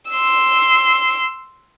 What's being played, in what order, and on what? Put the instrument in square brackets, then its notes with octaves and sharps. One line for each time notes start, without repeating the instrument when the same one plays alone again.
[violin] C6 E6